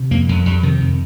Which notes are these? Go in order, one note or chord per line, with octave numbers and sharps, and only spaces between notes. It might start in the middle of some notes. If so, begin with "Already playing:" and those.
Already playing: C3
F2 A#3
F2
F2 G3
C3 D#3
F2